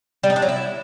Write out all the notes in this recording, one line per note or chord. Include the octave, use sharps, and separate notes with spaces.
G3
D#4
D4
F#3
E4